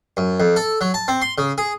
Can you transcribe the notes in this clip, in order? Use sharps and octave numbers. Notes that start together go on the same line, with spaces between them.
F#2
F2
A4
F#3
A5
C4
C6
C#3
G#4